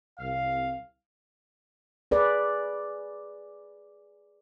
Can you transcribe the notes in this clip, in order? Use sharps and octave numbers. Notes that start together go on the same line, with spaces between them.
C2 F5
G#4 B4 D5